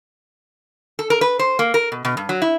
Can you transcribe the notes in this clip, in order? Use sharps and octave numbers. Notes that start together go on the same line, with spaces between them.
A4
A#4
B4
C5
A#3
A#4
B2
B2
G2
F#3
E4